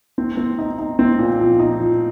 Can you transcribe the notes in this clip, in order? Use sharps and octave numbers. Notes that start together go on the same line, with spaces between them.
C4
C4
D#4
D#4
C4
A#2
F3
D#4
F3